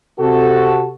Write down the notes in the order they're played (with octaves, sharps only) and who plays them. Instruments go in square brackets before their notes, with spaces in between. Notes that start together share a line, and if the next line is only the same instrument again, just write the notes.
[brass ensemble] C3 F#4 A4